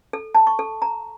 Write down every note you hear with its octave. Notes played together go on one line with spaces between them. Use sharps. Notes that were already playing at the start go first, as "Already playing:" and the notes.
A4
A5
C#6
A4
A#5